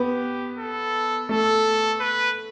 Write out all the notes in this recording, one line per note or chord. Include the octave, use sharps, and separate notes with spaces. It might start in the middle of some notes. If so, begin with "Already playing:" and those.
Already playing: B3 G4
A4
A3 A4
B4